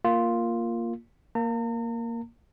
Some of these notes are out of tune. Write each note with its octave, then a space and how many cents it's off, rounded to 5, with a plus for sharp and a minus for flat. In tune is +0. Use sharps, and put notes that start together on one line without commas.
A#3 +0 F4 +0
A#3 +0 A#5 -45